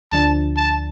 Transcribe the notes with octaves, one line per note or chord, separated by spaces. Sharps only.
D2 D3 F3 D4 A5
A5